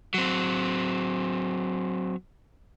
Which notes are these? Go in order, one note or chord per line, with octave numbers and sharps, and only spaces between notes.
F#3 C4